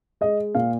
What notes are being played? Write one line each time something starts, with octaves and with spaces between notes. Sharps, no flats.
G#3 D#5
A#2 F5